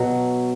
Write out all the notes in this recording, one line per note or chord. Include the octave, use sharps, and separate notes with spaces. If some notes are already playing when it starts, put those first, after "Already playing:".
Already playing: B2 F#3 F#4